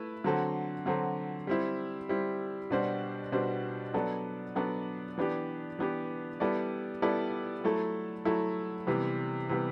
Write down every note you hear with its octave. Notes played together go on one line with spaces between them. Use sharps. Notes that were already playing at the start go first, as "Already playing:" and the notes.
Already playing: A3 E4 B4
D3 F#3 C4 F#4 A4
D3 F#3 C4 F#4 A4
G3 C4 E4
G3 C4 E4
B2 G3 D4 F#4 C5
B2 G3 D4 F#4 C5
F#3 B3 D4 A4 D5
F#3 B3 D4 A4 D5
E3 B3 D4 G4
E3 B3 D4 G4
G3 B3 E4 A4 D5
G3 B3 E4 A4 D5
F#3 A3 E4 A4
F#3 A3 E4 A4
C3 E3 G3 B3
C3 E3 G3 B3